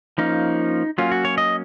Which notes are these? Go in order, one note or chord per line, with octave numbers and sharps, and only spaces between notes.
F3 A#3 C#4 D#4
F#3 A#3 C#4 F4
F#4
C#5
D#5